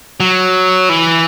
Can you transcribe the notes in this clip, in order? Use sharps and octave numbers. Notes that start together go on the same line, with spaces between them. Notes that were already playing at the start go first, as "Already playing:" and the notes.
F#3
E3